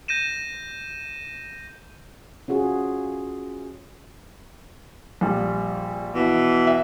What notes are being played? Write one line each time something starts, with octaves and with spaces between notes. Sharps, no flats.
G6 A#6 D#7 E7
C#4 F4 F#4 G#4
A#1 G3
B2 E3
E5